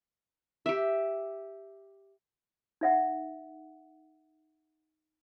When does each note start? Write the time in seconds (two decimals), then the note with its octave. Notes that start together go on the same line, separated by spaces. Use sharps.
0.66 G4 E5
2.81 D#4 E5 F#5